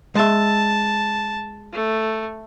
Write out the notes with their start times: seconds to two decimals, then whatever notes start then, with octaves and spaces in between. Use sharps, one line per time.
0.15 G#3 E5 A5
1.73 A3